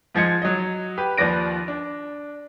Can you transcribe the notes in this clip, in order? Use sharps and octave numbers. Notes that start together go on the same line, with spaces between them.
G#2 F3 G#3 G#6 C#7
F#3 D#5
G4 B4
D#2 F3 B4 D5 A#6 D7
D4